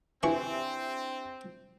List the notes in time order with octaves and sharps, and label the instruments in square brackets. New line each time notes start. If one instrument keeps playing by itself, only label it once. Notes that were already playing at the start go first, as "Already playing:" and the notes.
[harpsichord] E3 C#6 [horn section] C4 [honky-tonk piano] D4 E4 G4 [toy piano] G#5